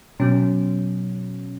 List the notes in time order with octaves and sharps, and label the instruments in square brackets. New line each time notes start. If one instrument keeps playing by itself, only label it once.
[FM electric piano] B2 F#3 C#4